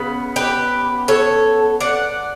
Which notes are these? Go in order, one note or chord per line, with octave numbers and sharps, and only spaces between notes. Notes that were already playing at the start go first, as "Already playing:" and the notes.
Already playing: C#3 B3
G4 B4
A4 C#5
D5 F#5